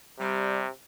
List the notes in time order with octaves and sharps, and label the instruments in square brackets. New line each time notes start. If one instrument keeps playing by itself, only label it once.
[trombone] C3 [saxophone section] G3